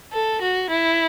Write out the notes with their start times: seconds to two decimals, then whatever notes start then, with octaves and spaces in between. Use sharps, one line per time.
0.12 A4
0.41 F#4
0.70 E4